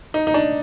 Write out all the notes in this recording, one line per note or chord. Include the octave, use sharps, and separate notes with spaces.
D#4
D#4
D4